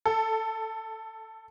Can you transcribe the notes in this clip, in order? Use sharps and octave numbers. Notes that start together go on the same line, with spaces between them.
A4